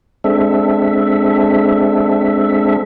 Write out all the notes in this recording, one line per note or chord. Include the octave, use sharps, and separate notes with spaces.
G#3 C4 D4 A4 E5